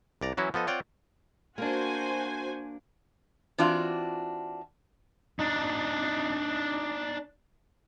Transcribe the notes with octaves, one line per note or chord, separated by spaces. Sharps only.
C2 D5 A#5
E3 F#3 C#4 E4 F#4
F3 B3 A4 D#5
C4 F4 C#5 D5 F#5 G5
A#3 D4 F#4 C5 G#5
E3 C4 D4 F4 F#4
D4 D#4